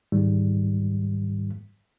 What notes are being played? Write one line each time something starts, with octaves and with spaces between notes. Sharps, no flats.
C#2 G#2 D#3 G3